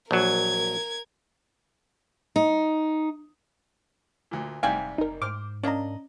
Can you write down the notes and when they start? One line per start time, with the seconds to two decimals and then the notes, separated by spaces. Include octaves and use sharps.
0.11 A#1 F#3 A#4 G#6
2.36 D#4
4.31 D2 A#2
4.63 F1 G#2 C3 G3 D5 F5 G5 G#5
4.98 F#1 D#4 A#4
5.22 G#2 C5 D6 F6
5.63 A#3 C#4 D4 D5 D#5 A#5